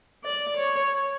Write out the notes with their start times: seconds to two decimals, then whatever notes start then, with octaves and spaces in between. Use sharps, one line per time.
0.24 D5
0.57 C#5